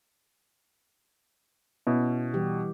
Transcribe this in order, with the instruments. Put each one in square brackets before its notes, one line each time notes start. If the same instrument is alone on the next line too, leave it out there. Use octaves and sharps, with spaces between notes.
[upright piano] B2 [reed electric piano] B3 C#4 E4
[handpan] E3 G3 G4